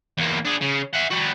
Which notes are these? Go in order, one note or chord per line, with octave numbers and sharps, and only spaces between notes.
E2 A#3
D4 G#4
C#3
E5 F#5
G3 F#4